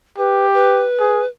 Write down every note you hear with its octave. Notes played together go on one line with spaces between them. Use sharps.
G4 B4
B4
G#4